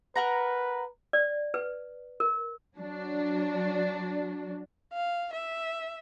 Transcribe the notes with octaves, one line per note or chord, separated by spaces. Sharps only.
A#4 B4 F#5 A#5
D5
B4
A#4
F#3 D4
F5
E5